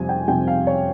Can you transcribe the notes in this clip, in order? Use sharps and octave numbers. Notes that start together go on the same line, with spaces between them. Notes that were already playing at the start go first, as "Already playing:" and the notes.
Already playing: F2 C3 G3 G#5
G5
F2 C3 G3 G5
F5
C#5